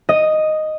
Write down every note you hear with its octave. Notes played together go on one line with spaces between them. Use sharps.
D#5